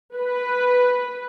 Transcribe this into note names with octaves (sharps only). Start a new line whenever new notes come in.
B4